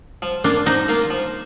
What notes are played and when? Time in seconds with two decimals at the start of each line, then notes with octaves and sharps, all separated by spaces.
0.22 F3
0.44 A#3 D4 F4 A#4
0.66 F3 D#4
0.88 A#3 F4 A#4
1.10 F3